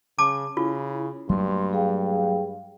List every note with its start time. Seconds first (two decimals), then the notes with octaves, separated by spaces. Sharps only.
0.19 C#3 A5 D6
0.57 C#3 E4 F4
1.29 G2 F#3 A3 A#3 C6
1.73 G#4 F5 G5